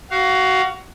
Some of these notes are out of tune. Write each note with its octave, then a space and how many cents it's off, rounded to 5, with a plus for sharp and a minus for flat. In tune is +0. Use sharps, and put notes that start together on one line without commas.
F#4 +20 F5 +0